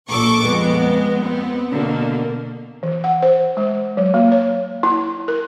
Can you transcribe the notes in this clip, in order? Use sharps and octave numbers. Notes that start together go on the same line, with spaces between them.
A#1 A#2 A4 C#6 D6
F2 G#3 B3
B3 C4
B2 D3 A#3
E3
F#5
C5
G#3
F#3
A#3
C#5
E4
A#4